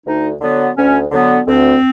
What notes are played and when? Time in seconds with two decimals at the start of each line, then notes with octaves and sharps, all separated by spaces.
0.06 D2 D#4
0.41 D3 F#3 B3
0.76 D2 C#4
1.12 D3 F#3 B3
1.46 D2 C4